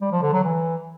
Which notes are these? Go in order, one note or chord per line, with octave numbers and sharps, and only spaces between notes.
G3
F3
D3
F#3
E3